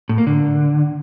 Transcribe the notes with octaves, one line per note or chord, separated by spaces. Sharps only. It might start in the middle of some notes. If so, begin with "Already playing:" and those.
A2
A#3
D3